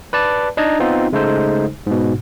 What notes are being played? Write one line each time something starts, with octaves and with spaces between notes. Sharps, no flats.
B4 D5 A5
D4 D#4 D#5 A5 A#5 G#6
B3 C4 D#4 F4
C#3 G#3 A3 D#4 A4 C5
G#2 B2